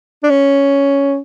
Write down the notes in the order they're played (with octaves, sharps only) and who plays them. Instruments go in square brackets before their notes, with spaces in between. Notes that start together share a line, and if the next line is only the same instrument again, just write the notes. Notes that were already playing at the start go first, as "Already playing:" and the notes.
[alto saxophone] D4
C#4